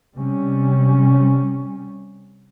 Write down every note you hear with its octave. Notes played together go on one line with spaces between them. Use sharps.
C3 G3 C#4